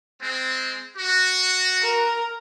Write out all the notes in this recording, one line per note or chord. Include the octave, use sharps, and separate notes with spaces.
G#3 C4
F#4
A#4